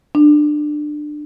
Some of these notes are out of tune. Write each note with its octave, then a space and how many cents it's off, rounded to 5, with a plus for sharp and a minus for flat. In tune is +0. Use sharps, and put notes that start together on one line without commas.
D4 +20